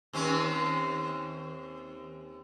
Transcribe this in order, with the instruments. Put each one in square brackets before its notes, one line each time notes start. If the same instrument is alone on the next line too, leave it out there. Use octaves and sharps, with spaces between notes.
[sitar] D#2 C4 C#4